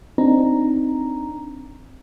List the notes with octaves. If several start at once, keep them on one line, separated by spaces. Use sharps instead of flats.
C4 D4 D#4 A#5